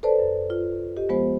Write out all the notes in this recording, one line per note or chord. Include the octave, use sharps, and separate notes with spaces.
A4 B4 C5 D5 A5
F#2
F4
G4 D#5
F3 G#3 B3 C5